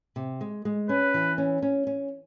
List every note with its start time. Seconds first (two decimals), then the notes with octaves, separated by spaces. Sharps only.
0.16 C3
0.41 G#3
0.65 G#3
0.89 C#4 B4
1.14 E3
1.38 C#4
1.62 C#4
1.87 C#4